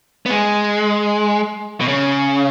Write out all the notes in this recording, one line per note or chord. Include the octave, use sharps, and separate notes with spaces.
B3
G#3
B2
C#3